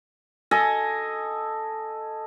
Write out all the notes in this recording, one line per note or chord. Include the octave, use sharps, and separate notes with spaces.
A4 D#5 G#5